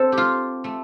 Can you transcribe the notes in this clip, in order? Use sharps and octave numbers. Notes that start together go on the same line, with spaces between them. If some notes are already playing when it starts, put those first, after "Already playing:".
Already playing: C4 A4 C5
G4
F4
A3